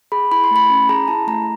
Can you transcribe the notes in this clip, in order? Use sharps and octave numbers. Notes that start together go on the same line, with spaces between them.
G#4 B5
E4 B5
C6
A3 B5
C#4
G#4 A#5
E4 A5
A3 A#5